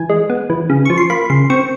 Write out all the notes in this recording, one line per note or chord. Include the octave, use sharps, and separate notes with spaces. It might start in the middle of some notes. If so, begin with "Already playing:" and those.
Already playing: E3 G#5
G#3
B3
E3
C#3
F3 C#6
C6
A#3 B5
C#3 C6
C4 C#6